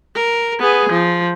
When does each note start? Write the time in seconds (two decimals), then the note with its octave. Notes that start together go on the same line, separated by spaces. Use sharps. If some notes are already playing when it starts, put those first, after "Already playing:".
0.16 A#4
0.59 B3 G#4
0.90 F3